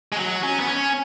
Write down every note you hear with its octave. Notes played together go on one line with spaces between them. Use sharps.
G#3
F#3
C#4
B3
C#4